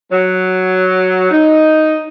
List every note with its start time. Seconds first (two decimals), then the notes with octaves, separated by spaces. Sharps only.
0.12 F#3
1.31 D#4